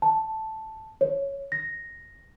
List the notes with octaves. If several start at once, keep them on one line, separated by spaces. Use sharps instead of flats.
A5
C#5
A#6